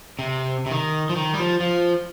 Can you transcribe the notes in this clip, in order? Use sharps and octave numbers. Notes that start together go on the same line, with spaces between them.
C3
C3
D#3
F3
D#3
G3
F3
F3